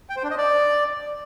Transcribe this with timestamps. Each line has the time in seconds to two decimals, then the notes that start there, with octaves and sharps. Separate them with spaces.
0.09 G5
0.16 C5
0.24 D4
0.31 D#5
0.38 D5